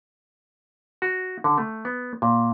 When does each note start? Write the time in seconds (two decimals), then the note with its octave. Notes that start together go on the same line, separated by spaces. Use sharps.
1.02 F#4
1.44 D3
1.58 A3
1.85 B3
2.22 A#2